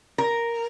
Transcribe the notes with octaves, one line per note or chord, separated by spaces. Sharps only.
A#4